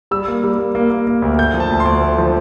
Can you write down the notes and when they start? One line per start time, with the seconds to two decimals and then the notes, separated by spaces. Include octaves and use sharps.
0.11 G3 E6
0.28 A#3
0.44 G3
0.58 A#3
0.75 A#3
0.90 A#3
1.07 A#3
1.22 D2
1.38 A3 G6
1.54 F3
1.60 A5
1.71 D2
1.80 C6
1.85 D2
2.02 A3
2.18 F3